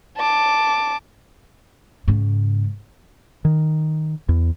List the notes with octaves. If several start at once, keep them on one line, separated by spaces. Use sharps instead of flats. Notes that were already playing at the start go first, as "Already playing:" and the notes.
A5 D6
G#2 C#3
D#3
E2